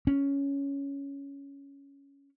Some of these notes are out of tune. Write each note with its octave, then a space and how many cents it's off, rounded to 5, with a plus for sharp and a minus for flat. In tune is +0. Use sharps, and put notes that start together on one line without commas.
C#4 +10